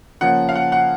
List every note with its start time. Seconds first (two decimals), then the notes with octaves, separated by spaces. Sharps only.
0.21 C#3 F3 A#3 F#5
0.49 F5
0.55 F#5
0.72 F#5